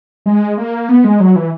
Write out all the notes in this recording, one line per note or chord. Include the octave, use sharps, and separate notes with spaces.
G#3
A#3
B3
G#3
F#3
E3